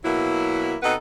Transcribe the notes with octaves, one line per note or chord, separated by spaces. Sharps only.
B2 F#3 A#3 E4
B2 C4 D#4 A4 B4 F#5